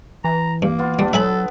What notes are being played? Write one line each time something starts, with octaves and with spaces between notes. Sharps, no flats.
E3 A#5
G2 A#3
B3 F4
G3 B3 D4
F#3 A4 E5 G#5 B5